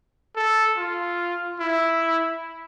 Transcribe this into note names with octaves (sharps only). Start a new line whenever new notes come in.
A4
F4
E4